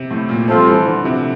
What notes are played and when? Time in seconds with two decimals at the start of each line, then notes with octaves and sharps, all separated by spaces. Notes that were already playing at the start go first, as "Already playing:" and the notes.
Already playing: C3
0.11 A2
0.29 A#2
0.48 F3 G3 C4 F4 A4 C5
0.67 E3
0.86 D3
1.05 C3